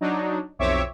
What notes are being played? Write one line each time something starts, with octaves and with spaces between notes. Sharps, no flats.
F#3 D4 D#4
B1 F2 C4 C#5 E5 D6